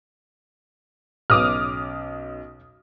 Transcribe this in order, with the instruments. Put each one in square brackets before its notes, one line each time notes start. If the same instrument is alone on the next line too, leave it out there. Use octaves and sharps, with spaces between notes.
[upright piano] B1 C#4 B4 [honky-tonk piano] D6 D#6 F6